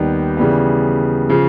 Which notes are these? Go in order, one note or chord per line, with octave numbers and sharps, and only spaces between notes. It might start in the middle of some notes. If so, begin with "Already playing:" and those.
Already playing: D#2 D#3 G3 B3
C#3 E3 G3 B3
C#3 F3